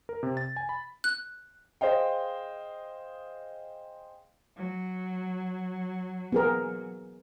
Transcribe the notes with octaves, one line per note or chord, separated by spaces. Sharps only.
A#4
C3
A6
G#5
B5
F#6
G#4 C5 D#5 F5 G5
F#3
B3 G#4 A#4